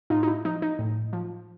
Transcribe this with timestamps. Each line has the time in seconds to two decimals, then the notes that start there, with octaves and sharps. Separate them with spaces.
0.10 A2 D#4 F4
0.23 D#4
0.28 E4
0.45 F3 D#4
0.62 D#4
0.79 A2
1.13 F3